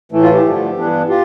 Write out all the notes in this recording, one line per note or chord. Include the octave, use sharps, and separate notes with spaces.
A2 E3 A3
F4
G4
G2 D3 F3 A3
G2 E3 B3 D4
F4 G4